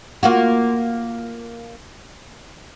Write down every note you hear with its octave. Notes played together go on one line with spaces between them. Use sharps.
A#3 F4 F#4